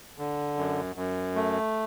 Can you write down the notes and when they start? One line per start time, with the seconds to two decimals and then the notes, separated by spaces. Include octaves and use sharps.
0.18 D3
0.57 F#2
0.96 F#2
1.36 A3